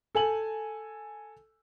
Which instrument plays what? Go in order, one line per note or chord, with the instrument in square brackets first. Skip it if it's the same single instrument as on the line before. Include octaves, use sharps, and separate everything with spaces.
[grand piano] A4 G#5 F#7